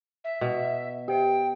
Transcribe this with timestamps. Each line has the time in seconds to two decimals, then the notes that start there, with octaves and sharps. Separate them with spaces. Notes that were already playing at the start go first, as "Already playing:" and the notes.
0.24 E5
0.41 B2
1.08 G4 C5 E5 G5